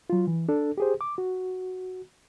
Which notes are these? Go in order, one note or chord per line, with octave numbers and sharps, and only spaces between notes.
F#3 F4
E3
D4 A4
G4 G#4 C5
D6
F#4